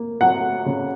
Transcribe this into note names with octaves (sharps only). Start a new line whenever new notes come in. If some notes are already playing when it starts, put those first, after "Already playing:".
Already playing: A#3
F#3 F#5
C#3